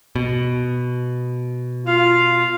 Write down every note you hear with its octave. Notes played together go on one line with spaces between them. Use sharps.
B2
F4 F5